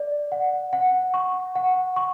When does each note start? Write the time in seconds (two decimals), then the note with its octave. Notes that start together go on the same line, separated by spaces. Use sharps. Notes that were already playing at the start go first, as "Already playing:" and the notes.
Already playing: D5
0.32 F#5
0.73 F#5
1.14 C#6
1.55 F#5
1.96 C#6